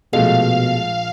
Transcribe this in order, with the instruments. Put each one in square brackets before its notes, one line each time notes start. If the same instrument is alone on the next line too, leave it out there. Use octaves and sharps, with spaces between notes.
[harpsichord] A#1 [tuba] B2 [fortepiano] G#3 A3 [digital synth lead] F5